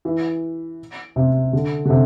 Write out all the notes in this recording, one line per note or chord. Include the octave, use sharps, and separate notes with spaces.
E3
C3
D3
D3
C3